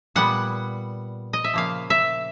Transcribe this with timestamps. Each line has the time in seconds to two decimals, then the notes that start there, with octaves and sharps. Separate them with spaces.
0.16 A#2 G3 B3 F#5
1.33 D#5
1.44 E5
1.54 C#3 F3 A#3 F5
1.90 E5